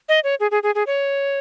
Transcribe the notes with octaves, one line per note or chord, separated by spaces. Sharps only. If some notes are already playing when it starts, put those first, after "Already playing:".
D#5
C#5
G#4
G#4
G#4
G#4
C#5